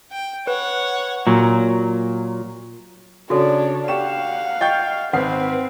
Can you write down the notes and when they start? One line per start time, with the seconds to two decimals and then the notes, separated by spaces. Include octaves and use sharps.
0.11 G5
0.47 B4 C#5 F#5
1.27 A#2 F#3
3.30 C#3 D4 F#4 A4 C#5 D5
3.88 G4 F5 F#5 C#6 E7
4.61 D#5 G5 C#6 G6
5.13 G#1 C4 B4 F#5 F6 C7